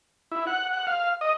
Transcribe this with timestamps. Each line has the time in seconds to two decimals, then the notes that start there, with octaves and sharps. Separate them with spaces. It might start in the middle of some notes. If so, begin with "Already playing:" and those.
0.32 E4
0.47 F#5
0.73 F#5
0.87 F5
1.21 D#5